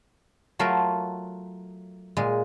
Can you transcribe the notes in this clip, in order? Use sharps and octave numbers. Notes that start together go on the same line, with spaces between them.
F#3 A3 F4 A#4
A#2 G#3